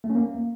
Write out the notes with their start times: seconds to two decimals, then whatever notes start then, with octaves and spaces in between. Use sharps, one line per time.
0.04 A3
0.10 C#4
0.15 A#3